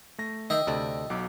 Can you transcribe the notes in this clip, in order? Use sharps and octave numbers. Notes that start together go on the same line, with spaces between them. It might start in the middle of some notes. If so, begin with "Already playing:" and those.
A3 A#6
D#3 D#5 E5 G5
D2 C3 A4 D5
B1 F#3 D6